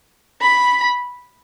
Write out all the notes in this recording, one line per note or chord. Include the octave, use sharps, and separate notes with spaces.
B5